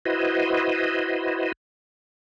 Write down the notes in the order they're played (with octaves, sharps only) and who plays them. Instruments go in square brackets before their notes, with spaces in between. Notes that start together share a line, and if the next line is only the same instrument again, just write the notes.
[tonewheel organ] E4 F#4 B4 C5 D#5